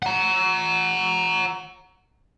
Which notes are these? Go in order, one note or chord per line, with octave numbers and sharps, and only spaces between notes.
F#5 A#5